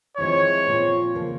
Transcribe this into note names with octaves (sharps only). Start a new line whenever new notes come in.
F3 G#3 C4 E4 G#4 C#5
A#2 F3 C4 F4
C#3 F3 A#3